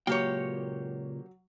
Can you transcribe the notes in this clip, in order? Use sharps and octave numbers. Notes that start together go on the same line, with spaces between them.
C#2 A#2 F#3 A#3 G4 C#5 G5